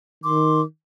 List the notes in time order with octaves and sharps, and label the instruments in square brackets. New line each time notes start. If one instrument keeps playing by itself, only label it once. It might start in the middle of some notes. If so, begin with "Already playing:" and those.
[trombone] D#3 [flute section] C6 D6